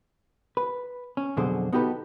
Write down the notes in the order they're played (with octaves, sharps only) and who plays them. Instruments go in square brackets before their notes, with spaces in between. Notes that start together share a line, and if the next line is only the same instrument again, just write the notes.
[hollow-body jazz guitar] B4
C#4
F2 B2 D3 F#3 G#4 C5
B3 D#4 F#4 G4 A4 B4